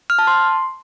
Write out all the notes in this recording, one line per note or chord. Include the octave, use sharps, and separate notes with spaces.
F6
A5
C6